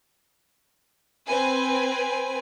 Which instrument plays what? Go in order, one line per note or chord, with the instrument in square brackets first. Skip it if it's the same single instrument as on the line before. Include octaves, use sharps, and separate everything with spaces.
[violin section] C4 B4 G#5